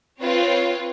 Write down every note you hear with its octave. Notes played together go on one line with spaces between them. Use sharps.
C4 F4 B4 C#5